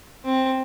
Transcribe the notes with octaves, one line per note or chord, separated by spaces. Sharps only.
C4